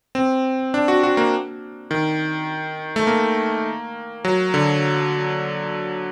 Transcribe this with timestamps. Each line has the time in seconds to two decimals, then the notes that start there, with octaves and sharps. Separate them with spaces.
0.15 C4
0.74 D4
0.88 F#4
1.03 F#4
1.17 A#3
1.91 D#3
2.96 A3
3.07 A#3
4.25 F#3
4.54 D3